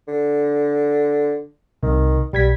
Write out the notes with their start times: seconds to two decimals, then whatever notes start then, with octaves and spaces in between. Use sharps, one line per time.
0.08 D3
1.83 C2 C3 D#3
2.33 B1 G3 G#6 B6